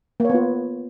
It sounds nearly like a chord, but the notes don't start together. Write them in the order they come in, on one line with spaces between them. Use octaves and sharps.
A#3 C#5 B3 F4